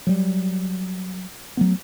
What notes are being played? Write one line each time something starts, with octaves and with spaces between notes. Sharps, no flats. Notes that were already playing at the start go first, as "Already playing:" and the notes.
F#3 G3
F#3 A3 B3